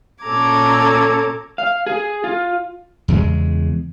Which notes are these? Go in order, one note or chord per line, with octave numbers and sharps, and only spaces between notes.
A#2 C#4 A4 A#5 D6 G#6
F5
G#4
F4
E2 C#3 G#3